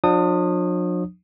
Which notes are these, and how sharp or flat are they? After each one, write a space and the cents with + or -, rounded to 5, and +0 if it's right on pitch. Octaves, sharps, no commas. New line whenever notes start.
F3 +45 D4 +30 D#6 -15